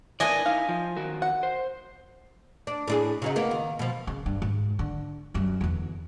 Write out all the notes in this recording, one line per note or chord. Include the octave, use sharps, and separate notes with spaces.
E3 D4 E4 A#4 B4 D5 D#5 G#5
D#4 E4 F5
F3
D#3 F#4 A#4
F#5
C5
D4
A2 D4 G#4
C#3 F#3 D#4
A#3 B3
D#3
B2 F3
C#3
G2
G#2
D3
F#2 G3
E2 D3